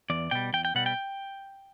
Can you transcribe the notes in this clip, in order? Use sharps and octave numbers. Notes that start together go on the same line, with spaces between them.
E2 D5
B2 G3 G5
E2 G5
G5
B2 G3 F#5
G5